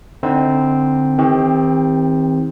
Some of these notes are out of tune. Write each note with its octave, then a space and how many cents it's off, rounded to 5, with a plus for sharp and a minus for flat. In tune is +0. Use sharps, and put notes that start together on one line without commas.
D3 +15 C4 +0 D#4 +40
D#3 +40 C4 +0 G4 +35